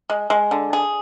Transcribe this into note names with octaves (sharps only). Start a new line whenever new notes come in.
G#3
G#3
D3
G#4